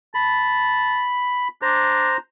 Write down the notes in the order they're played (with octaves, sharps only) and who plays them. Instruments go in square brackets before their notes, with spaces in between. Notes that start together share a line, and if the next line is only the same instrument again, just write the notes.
[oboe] A5 [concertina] B5
[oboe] D4 [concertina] C5 A#5